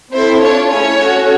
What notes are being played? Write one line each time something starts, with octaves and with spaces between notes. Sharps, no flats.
C4 E4 A4 C5
D4 F4 A4 C#5
A3 C#4 E4 G#4 C#5
C#4 F#4 A4